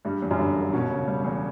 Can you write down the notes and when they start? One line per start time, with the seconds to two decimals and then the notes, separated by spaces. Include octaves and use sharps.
0.05 G2 G3
0.22 E2
0.31 F#2
0.39 G2 D3
0.56 E1
0.73 B2 C#4
0.90 C#3
1.08 G3
1.25 E2